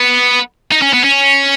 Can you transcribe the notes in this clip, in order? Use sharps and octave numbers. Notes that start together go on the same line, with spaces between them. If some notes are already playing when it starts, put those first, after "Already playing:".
Already playing: B3
D#4
C#4
B3
C#4